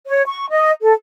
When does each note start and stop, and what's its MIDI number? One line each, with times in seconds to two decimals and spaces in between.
0.07 0.22 73
0.26 0.46 85
0.50 0.71 75
0.81 0.93 69